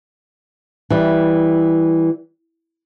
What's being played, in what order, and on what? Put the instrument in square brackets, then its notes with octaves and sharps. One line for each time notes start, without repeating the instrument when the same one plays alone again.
[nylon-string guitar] E3 G3